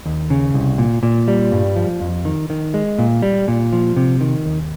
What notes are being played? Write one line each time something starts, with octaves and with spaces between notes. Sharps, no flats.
D#2
C#3
C2
A#2
A#2
G3
G2
F3
F2
D#3
D#3
G#3
A#2
G3
A#2
F3
C3
D#3
D#2